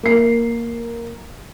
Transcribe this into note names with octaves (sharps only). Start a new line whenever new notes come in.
A#3 C7